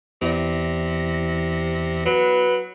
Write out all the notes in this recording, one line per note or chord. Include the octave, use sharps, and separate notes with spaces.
E2 C3 E3 B3 E4 D5 A#6
F#3 B4